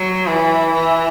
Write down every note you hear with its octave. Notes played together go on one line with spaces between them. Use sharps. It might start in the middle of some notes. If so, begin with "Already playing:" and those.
Already playing: F#3
E3
E3